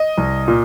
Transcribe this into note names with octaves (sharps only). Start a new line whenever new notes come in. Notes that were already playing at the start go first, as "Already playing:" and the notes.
Already playing: D#5
C2
A#2